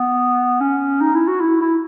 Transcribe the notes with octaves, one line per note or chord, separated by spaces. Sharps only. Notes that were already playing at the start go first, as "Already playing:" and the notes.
Already playing: B3
C#4
D#4
E4
F#4
E4
E4